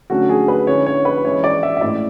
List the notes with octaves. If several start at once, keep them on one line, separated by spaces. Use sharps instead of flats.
D3 F#3 A3 C#4 F#4
G#4
B4
D3 G#3 C#4 E4 C#5
C#5
B4
E3 G#3 C#4 E4 C#5
D5
E5
E5
A2 G#3 C#4 E4 D5